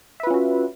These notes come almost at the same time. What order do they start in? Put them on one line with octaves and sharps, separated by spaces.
E5 B4 F4 C#4 F#4